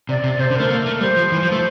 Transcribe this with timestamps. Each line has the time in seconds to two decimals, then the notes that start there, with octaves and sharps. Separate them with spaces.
0.09 C3 D5
0.24 C3
0.39 C3 C5
0.50 D3
0.55 A3 A#4
0.70 A#3 A4
0.85 A3 A#4
1.01 G3 C5
1.16 F3
1.32 E3
1.42 F3
1.52 A3